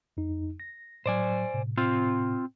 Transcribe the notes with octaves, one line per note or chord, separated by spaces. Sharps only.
F2 D#4
A#6
A2 F#3 C5 D5 G#5
A2 C3
C4 F4